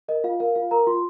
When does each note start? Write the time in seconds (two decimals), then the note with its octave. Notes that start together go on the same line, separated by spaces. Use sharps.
0.08 A#4 D#5
0.24 F4 F5
0.40 A#4 F5
0.55 F4 F5
0.71 A#4 A#5
0.87 F4 C6